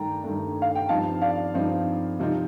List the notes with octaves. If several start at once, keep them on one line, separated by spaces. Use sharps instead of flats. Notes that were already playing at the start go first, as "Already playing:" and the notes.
Already playing: G2 D#3 A3 D4 G5 A#5
G2 D#3 A3 D4
F5
G5
G2 F3 C4 D#4 F5 A5
D5 F5
G2 F3 C4 D#4
C3 F3 C4 D#4